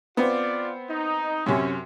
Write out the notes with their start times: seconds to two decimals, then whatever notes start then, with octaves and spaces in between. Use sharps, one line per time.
0.17 B3 C4 F4 D5
0.90 D#4
1.46 F#2 C3 C#4